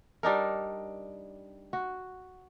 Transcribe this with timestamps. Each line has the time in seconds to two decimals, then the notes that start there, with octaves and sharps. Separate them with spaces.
0.23 G3 D4 D#4 A#4
1.73 F#4